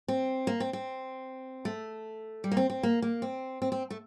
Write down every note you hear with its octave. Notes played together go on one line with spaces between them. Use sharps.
C4
A#3
C4
C4
A3
G3
A#3
C4
C4
A#3
A#3
C4
C4
C4
A3